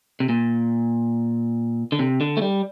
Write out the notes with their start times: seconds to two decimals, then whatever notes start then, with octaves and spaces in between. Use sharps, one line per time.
0.20 C3
0.29 A#2
1.92 D3
1.99 C3
2.21 D3
2.37 A3
2.42 G3